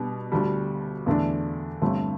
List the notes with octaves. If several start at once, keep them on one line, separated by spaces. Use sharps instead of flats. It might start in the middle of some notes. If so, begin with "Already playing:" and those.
Already playing: B2 G3 D4
D2 D3 G3
E2 D3 A3 D4
G1 G2 D3 A3 C4